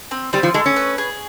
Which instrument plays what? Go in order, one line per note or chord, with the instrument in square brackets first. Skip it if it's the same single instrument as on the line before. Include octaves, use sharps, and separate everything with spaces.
[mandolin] C4
[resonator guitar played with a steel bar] G3 [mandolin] C4
[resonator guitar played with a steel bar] F3
[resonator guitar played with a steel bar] G#3 [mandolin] A3
[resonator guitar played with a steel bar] C#4
[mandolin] B4
G#4